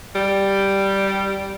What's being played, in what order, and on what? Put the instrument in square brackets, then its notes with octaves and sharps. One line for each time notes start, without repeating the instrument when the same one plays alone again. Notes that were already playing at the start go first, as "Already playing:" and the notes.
[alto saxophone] G3